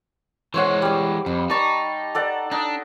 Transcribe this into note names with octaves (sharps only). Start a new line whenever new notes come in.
E3 G#3 C5 C#5 F#5
G3 D6
F2 B5
D#4 D5 A5 C#6
A4 D5 F#5
D4 D#4